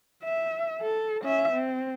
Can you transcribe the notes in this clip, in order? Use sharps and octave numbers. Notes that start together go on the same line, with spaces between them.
E5
A4
C#4 E5
C4